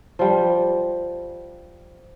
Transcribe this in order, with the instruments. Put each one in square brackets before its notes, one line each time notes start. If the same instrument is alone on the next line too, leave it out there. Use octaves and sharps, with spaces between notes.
[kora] F3 G3